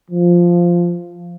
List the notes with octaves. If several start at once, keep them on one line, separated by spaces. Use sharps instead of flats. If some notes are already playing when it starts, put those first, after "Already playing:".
F3